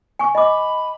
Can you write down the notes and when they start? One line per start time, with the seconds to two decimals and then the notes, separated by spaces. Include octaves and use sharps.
0.19 G#5 C#6
0.35 D#5 B5 D6